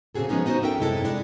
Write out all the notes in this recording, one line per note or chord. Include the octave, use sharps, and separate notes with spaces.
A#2 C#3 C4 F#4 G#4 A4
F3 G#3 B3 C#4 D#4
B3 D#4 F#4 A#4 C5
A4 A#4 E5 G5
F#2 C3 G#3 E4 A4
G#3 D4 E4